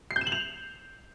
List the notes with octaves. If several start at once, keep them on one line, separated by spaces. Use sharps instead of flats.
C7
G6
E7
F#7
F7